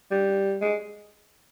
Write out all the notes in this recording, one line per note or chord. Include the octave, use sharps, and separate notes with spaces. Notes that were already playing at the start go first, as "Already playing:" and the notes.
G3
G#3